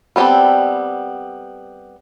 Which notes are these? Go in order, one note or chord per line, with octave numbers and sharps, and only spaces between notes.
G3 B3 C4 G4 A4